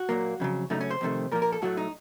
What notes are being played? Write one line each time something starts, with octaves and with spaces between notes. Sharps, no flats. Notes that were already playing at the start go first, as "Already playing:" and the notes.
Already playing: F#4
A#2 F#3 A#3
F2 C#3 F#3
F#2 C#3 A3 D#4
C#4
C5
F2 C3 D#3 A3
A#2 F3 A#3 A#4
A#4
A4
A2 F#3 A3 F#4
D#4